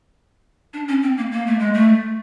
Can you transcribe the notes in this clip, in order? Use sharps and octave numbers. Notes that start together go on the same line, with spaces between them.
D4
C#4
C4
A#3
A#3
A3
G#3
A3